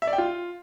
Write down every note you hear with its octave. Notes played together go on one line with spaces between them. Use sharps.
E5
D5
G5
F4